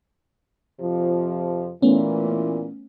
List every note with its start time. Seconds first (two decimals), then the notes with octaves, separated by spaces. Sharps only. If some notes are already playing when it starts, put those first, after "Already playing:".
0.80 F2 C3 F3
1.82 A#2 E3 A3 B3 C#4